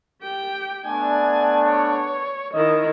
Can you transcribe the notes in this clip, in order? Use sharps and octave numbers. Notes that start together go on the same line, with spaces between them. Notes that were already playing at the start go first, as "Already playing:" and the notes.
G4 G5
A3 B3 D4 G#5
C#5
D#3 E4 D#5